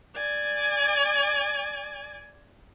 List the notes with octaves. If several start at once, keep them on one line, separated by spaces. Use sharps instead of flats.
D5 G#5